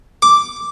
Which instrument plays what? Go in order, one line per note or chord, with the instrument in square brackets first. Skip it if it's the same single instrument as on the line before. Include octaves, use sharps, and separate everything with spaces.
[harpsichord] D6